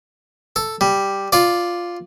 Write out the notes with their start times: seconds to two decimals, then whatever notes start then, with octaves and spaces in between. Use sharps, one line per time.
0.56 A4
0.81 G3
1.32 F4 D5